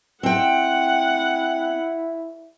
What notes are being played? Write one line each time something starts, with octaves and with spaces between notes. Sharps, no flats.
C4 E4 F#5 G5